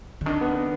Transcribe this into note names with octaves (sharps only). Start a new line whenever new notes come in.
D3
D#3 D4
B3
B3